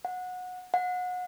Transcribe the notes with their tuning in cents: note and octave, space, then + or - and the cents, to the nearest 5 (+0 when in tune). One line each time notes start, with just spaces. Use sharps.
F#5 -20
F#5 -30